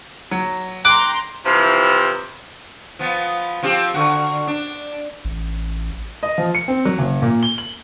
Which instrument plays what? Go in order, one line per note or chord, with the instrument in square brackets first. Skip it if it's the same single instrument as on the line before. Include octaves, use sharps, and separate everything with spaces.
[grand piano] F#3
[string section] G5 A#5 C6 [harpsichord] D6 [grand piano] F#6
[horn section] C3 E3 F3
[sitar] F3 B3
F3 C4 G4
D3 F#4
D4
[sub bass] A1
[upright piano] D#5
F3
C#7
C4
F#3
F#1
A#2
G7
F#7